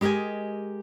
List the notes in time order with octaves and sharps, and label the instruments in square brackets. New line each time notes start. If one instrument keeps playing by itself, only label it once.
[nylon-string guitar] G#3 G4 A#4 D#5 G#5